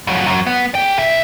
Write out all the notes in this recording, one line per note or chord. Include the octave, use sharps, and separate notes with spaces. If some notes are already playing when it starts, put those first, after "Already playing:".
F2 F#3
F#2 F#3
B3
G#4 G5
C2 E5